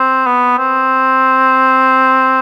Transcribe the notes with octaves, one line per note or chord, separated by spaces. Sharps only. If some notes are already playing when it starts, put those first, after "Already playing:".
Already playing: C4
B3
C4